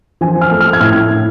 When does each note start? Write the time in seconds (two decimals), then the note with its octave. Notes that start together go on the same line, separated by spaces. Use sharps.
0.21 F3 G#5
0.42 F6
0.51 A3
0.61 F6
0.73 G#6
0.80 A2 F6
1.11 A2